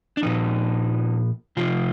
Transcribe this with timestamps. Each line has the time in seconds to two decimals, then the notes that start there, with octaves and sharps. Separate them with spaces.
0.17 D4
0.23 A#2 F3 D#4
1.57 C3 F3 F4